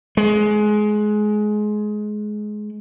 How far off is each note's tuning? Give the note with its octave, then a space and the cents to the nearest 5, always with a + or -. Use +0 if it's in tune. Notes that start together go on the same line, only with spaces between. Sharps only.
G#3 +20